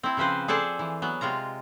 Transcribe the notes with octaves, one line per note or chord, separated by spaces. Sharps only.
C4 E4
C#3 F3 C4 B4 C5
G#4 A4 C5 D5 A5
E3
F#3 B3
C3 G#3 F4 A#5